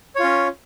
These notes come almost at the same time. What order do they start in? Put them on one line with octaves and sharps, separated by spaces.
C#5 F4 C#4